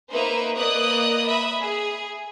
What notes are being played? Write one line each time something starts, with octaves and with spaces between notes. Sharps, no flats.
A#3 D#4 B4 C5 E5
A#3 B4 D5 D#5 D#6 F#6
E5 B5 D#6
G#4